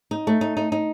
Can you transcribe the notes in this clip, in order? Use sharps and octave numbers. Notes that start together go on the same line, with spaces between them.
D#4
A3
D#4
D#4
D#4